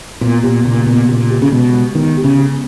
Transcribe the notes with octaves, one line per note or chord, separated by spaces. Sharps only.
A#2 B3
A#2 G4
A#2 C#3
A#2 B3
A#2 C#3
G4
C#3
B2 G#3
G#3
D#3 B3
G4
C#3
G4